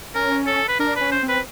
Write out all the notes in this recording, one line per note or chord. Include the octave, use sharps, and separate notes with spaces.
C#4 A#4
A4
B4
D4 A#4
C#4 B4
C5
C4
B4